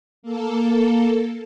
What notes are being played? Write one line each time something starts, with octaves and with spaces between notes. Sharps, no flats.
A#3 A4